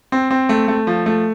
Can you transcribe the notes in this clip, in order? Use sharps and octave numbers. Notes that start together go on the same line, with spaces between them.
C4
C4
A3
A3
F3
A3